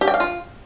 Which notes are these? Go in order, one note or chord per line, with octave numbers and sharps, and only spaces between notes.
G4
G5
F5
F4